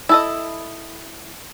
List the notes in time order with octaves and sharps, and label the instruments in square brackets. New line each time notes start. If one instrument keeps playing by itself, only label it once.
[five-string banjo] E4 A4 D#5